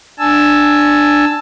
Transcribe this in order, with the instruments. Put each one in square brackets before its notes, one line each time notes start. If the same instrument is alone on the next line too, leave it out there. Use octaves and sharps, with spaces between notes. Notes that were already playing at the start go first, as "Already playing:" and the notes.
[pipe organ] D4 G#5 A5 E6